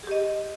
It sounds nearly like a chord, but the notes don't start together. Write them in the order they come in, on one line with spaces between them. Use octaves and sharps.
G#4 G4 D#5